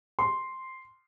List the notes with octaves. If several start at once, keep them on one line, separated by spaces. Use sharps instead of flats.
C6